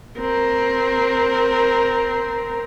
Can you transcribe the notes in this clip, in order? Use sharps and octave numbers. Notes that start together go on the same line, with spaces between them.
C4 A#4